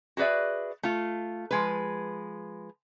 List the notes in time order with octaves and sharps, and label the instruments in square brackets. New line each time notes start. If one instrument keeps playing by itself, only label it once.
[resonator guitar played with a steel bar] F#4 G#4 B4 D5 E5
A3 F4
F3 G#3 B4